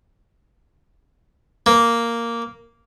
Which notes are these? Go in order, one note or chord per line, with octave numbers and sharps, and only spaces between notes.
A#3